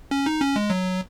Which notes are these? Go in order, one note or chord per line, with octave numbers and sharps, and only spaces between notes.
C#4
D#4
C#4
G#3
F#3